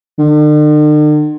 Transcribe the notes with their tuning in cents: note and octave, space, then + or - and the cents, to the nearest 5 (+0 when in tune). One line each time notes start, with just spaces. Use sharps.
D3 +45